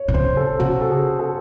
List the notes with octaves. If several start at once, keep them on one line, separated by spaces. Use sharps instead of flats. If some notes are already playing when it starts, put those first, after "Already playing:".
Already playing: C#5
C3
C#3 C5
A4
C#3 F#4
A4
G#4
A4